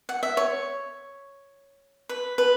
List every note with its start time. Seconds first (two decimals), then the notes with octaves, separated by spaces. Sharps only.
0.09 F#5
0.23 E5
0.37 C#5
2.09 B4
2.38 B4